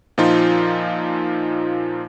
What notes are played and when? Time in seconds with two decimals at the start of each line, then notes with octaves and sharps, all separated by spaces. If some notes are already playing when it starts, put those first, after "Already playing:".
0.18 A#2 F3 D#4 F4